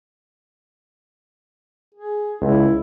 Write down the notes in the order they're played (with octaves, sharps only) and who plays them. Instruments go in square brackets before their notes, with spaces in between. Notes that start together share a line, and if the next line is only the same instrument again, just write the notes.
[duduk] G#4
[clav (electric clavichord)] C#2 [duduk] E4